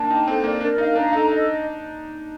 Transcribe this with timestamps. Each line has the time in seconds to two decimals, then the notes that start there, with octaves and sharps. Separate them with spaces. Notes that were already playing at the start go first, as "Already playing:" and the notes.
Already playing: A#3 D4 A5
0.10 D#4 G5
0.28 C4 A4
0.44 A#3 D5
0.61 D4 A#4
0.78 D#4 F5
0.95 D4 A#5
1.13 D#4 A4
1.29 D#5